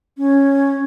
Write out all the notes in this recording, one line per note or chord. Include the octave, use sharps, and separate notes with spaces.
C#4